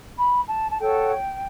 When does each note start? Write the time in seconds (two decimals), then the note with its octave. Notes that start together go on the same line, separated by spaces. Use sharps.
0.17 B5
0.48 A5
0.70 A5
0.80 F#4 A4 C#5 G5